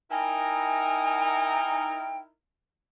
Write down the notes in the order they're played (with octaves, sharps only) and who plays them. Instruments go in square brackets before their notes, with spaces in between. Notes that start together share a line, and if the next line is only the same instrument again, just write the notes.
[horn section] D#4 E4 A#4 [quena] G5 [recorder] G#5